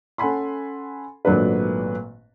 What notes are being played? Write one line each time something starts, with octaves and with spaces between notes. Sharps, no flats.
C#4 A4 F#5 G#5 B5 C6
G#1 A#2 F#3 A3 D4 B4